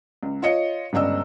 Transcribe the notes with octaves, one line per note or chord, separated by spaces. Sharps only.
C#2
F4 C#5 D#5 C#7
G1 C#2 D5 D#5 E6